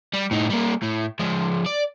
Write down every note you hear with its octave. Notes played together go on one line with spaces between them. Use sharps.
G3
A2 D#4
G3 A#3
A2
F3 G#3
D5